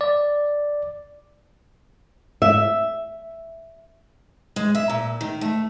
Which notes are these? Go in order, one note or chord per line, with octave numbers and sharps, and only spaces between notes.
D5
E5
G#3
E5
A#2
D#3
A3